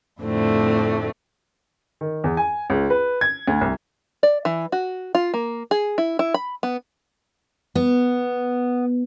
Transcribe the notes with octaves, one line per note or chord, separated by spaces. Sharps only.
F2 A2 D3 A3 C4
D#3
E2
G#5
C#2
B4
G#6
D2
C2
D5
E3
F#4
F4
A#3
G#4
E4
E4
B5
B3
B3